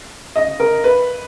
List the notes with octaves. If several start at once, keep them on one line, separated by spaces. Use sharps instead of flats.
D#5
A#4
B4